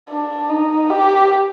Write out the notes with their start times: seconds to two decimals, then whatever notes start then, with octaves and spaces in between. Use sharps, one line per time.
0.10 D4
0.50 D#4
0.90 G4